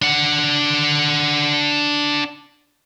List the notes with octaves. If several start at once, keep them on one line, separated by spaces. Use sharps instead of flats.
D4 F#5